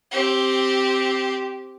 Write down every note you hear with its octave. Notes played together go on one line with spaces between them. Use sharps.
C4 G4